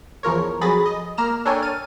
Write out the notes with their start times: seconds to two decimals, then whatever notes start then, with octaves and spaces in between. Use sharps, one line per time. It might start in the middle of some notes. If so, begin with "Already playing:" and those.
0.23 E2 F3 A#4 C#5
0.61 F2 F#3 G#4 B5 A6 A#6
0.86 D#5
1.17 A#3 A#5 F6 E7
1.45 D4 A4 A#4 C#5 G5 G#5
1.62 F6 A6 D#7